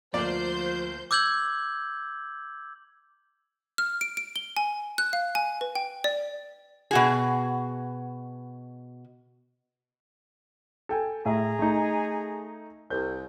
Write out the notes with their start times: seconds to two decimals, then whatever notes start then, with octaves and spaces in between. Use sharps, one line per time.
0.14 D2 F3 A#3 C5 D5 C6 G6
1.11 D6 E6 G6 G#6 F#7
3.78 F6
4.01 D7
4.17 D7
4.36 G7
4.57 G#5
4.98 F#6
5.13 F5
5.35 G#5
5.61 B4
5.75 G5
6.04 D5
6.91 B2 F#4 G#4
10.89 A4 G5 G#5
11.25 A2 G#4 E5 A#5
11.59 A3 D#4
12.90 C2 G6